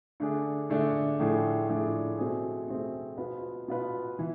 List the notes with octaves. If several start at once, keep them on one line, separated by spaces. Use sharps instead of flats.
D3 A3 D4 G#4
D3 A3 D4 G#4
A2 F3 A3 D4 G#4
A2 F3 A3 D4 G#4
B2 A3 C4 G#4
B2 A3 C4 G#4
B2 B3 F4 B4
B2 B3 F4 B4
E3